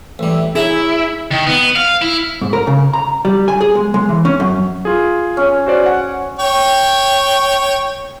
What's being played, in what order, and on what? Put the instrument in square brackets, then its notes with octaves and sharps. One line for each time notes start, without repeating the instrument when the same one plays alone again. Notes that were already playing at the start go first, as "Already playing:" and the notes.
[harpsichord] A1 G3 [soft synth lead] E5
[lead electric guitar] E4 [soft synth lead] G#4 [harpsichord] C#5 E5 A#5
[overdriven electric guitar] D#3
B3
F5
E4
[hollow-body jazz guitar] G#2
A#4
C#3
A#5
G3
G#5
G#4
G#3
G#3
E3
C#4
F#2
[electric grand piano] F4 G#4
[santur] C#4
[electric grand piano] F#4 C5 D5
F#5
[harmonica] C#5 G5